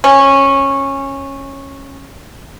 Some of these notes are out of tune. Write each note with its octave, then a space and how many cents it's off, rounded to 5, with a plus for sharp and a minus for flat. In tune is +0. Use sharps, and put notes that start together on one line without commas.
C#4 -15